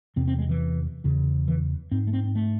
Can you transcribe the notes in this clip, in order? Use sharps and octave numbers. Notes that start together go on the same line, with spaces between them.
E2 C3 C4
C4
G#3
E3
E2 C#3
E3
G#2 C4
A3
C4
C4
A3